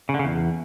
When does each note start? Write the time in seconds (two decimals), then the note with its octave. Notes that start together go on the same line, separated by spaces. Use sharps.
0.09 C#3
0.14 D3
0.19 C#3
0.25 E2